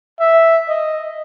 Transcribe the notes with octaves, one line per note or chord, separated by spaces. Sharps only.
E5
D#5